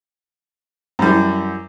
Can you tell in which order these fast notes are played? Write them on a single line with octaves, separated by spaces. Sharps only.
F#2 G3 E3